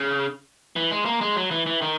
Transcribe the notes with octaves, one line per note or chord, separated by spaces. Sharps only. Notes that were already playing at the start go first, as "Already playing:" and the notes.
Already playing: C#3
E3
G#3
A#3
G#3
F#3
E3
E3
D#3